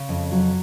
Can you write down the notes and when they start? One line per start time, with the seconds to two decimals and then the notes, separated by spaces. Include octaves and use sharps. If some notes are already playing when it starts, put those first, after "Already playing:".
Already playing: C#3
0.09 F2
0.32 F#3